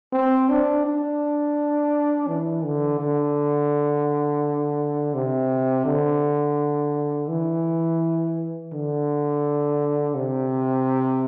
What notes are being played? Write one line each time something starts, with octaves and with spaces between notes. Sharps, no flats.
C4
D4
D4
E3
D3
D3
C3
D3
E3
D3
C3